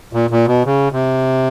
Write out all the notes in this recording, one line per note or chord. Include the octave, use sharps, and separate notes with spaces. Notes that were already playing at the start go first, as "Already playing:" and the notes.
A#2
A#2
B2
C#3
C3